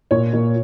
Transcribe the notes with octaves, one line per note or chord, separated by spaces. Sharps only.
A#2 C#5
A#2